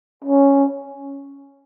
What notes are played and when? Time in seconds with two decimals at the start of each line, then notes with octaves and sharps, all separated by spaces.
0.24 C#4